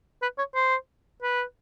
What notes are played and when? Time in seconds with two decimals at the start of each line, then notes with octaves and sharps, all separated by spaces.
0.22 B4
0.38 C#5
0.55 C5
1.23 B4